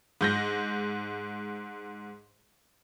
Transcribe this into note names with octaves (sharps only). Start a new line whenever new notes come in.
G#2 G6 A#6